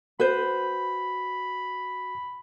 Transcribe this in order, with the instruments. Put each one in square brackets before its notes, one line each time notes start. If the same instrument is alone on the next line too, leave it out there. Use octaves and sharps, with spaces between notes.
[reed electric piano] F#4 [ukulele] B4 C5 [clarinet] B5